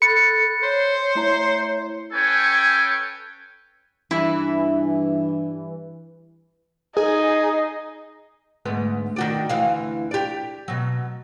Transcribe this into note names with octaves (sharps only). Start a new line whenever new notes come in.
A4 B5 F#6 A6 C#7
C5 C#5
A3 E4 A#5
C#4 A4 B4 C#5 G5 G#5
G2 E3 E4
D#4 G#4
D2 G#2 B3
D#3 F#4 D5
D2 E3 F5
G4 D5
B2 F#3